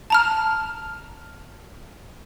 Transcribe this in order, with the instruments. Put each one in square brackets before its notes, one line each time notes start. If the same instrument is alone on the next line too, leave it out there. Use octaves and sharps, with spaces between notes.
[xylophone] A5 A#5 F6